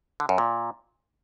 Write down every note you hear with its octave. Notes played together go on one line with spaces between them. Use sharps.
D3
F#2
A#2